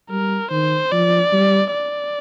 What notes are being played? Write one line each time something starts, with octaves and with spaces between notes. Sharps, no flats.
G3 A#4
D#3 C5
F3 D5
G3
D5